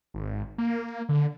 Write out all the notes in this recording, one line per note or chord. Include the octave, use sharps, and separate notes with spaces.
G#1
A#3
D3